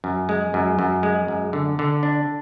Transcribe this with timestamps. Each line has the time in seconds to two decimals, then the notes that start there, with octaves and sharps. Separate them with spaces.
0.04 F#2
0.29 G#3
0.54 F#2
0.79 F#2
1.03 G#3
1.28 F#2
1.53 D3
1.79 D3
2.03 D4